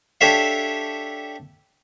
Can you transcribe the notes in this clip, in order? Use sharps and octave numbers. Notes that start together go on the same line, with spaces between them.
D4 G4 A4 C#5 E5 F5